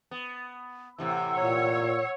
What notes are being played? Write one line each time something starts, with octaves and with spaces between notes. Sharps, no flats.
B3
A2 C3 E3 F#5 E6
A#2 C#5